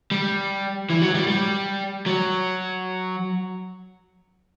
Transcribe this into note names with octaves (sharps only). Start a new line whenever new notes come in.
G3
E3
F#3
G3
G3
F#3